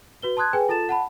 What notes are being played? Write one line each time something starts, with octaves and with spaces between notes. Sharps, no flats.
F#4 B4 G7
A5 C6 D#6 F#6 G#6
G#4 B4 G5 G#5
F4 A4 A5 A6 E7
F#5 A5 B5